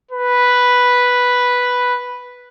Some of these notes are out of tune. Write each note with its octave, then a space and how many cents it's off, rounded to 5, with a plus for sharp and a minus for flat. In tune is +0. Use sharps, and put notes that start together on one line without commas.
B4 +0